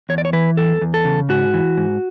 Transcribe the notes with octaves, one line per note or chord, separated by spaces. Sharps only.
E2 C#5
D5
C#5
E3 B4
E2 A4
E2
A4
C#3
G#2 F#4
E3
G#2